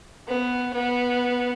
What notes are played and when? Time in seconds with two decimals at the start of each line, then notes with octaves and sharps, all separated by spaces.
0.28 B3
0.74 B3